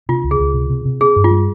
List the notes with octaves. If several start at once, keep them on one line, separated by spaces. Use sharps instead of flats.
C3 F4
C#2
G#4
C#2
C3
C3
C3
C4 G#4
G2
F4
G3